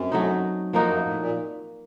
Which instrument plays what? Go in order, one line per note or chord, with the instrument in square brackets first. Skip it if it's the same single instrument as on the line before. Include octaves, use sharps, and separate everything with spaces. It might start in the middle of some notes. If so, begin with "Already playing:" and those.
Already playing: [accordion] F#2 [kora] C4
[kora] F#3 A3 D#4
F3 A#3 D#4 F#4
[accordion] F#2
A2
A#2